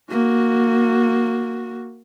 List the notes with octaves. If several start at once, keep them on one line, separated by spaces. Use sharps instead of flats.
A#3 F#4